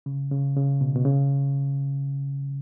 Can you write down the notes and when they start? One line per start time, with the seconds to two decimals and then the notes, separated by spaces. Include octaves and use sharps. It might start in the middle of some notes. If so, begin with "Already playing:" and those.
0.06 C#3
0.31 C#3
0.56 C#3
0.81 B2
0.95 B2
1.05 C#3